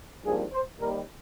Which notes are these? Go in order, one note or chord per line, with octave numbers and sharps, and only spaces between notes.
G#1 G2 F3 A#3 G#4
C5
D#2 D#3 G3 A#3 A#4